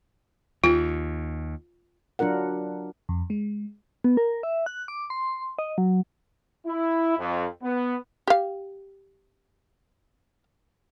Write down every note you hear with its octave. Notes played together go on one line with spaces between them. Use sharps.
D#2 F4
F#3 D4 F4 A#4 F#5
F2
G#3
B3
A#4
E5
F#6
D6
C6
D#5
F#3
E4
F2
B3
G4 F5